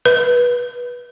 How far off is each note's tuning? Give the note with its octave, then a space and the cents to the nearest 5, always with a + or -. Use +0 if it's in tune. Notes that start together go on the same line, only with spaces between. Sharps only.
B4 -15